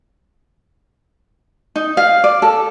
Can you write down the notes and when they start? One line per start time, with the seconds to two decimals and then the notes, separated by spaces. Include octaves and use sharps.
1.76 D#4
1.97 F5
2.24 D5
2.42 A4